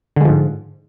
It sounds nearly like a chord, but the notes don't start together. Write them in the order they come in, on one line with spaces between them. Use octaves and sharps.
D3 G#3 F3 G#2